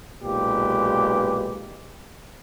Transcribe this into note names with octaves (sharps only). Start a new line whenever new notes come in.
B1 A#2 G#3 G4 B4